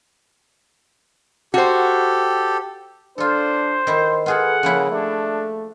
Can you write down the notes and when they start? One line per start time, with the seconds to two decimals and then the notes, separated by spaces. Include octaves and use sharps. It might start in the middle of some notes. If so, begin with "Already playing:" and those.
1.54 F#4 G4 A4 C5
3.18 D4 F4 A4 C5
3.87 D#3 E4
4.26 F4 G#4 A4 B4 F#5
4.63 C#3 F3 A#3 E4
4.91 A3 D4